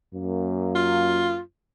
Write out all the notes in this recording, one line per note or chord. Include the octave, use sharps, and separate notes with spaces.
F#2 A#3
F4